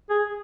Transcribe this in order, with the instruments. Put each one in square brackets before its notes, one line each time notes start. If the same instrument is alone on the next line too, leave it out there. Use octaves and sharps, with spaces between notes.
[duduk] G#4